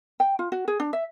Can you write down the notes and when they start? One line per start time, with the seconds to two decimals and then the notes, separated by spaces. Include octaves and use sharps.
0.20 G5
0.39 F4
0.52 F#4
0.68 G#4
0.80 D4
0.93 E5